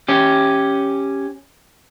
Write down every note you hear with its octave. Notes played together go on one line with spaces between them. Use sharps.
C#4 G4